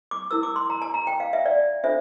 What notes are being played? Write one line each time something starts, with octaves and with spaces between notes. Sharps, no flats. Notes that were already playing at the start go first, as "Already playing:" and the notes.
D6
E4 A#4 E6
D6
C6
A#5
A5
A#5
G5
F5
E5
D5
D4 F4 A4 C5 E5